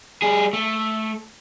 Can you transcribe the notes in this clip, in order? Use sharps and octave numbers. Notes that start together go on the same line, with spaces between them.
G3 G#4
A3